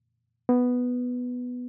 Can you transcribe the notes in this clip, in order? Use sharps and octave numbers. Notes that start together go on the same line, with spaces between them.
B3